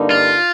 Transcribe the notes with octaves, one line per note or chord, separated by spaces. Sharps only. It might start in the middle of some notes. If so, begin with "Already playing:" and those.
Already playing: G2 D3 G3 A#3 D#4
F4